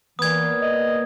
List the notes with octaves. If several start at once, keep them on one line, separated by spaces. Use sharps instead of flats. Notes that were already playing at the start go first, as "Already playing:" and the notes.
A#2 E3 B3 D#6 G#6
D#5